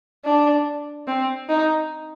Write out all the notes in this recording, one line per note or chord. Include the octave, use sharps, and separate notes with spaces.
D4
C4
D#4